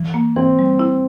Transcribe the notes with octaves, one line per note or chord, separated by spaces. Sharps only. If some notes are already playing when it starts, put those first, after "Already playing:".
Already playing: E3
A#3
E3 C4
G3
E4